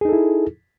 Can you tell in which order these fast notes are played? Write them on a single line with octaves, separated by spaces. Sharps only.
G#4 D#4 A4 E4